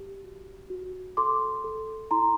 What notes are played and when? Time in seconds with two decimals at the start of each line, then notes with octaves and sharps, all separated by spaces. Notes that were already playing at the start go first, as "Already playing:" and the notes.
Already playing: G4
0.24 F#4
0.70 F#4
1.17 A4 C6 D6
1.64 A4
2.11 E4 A#5 C6